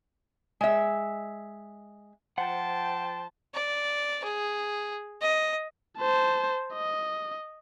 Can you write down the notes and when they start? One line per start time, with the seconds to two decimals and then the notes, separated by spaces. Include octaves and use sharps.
0.61 G#3 E5
2.38 F3 C5 F#5 G5 A5
3.54 D5
4.24 G#4
5.22 D#5
5.98 C5 A5
6.74 D#5